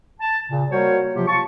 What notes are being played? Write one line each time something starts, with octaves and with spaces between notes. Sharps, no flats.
A5
A#2 C#3
G3 A#3 F#4 A#4 C5 C#5
C3 F3 F#3 A#3 F4 G4
F4 A5 C#6